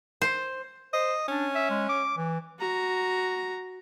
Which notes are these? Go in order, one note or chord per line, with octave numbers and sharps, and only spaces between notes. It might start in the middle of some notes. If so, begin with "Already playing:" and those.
C5
C5 D#5
C#4 D4
E5
G#3
D6
E3
F#4 A#5